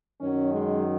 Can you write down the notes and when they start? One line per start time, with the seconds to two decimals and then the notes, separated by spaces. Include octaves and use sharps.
0.21 F#2 D#3 F#3 C#4
0.53 G#3